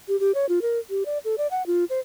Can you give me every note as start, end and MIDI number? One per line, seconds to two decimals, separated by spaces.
0.08 0.19 67
0.20 0.32 67
0.35 0.46 73
0.49 0.59 65
0.62 0.79 70
0.90 1.03 67
1.06 1.18 74
1.25 1.35 69
1.38 1.47 74
1.51 1.65 78
1.67 1.85 65
1.90 2.00 72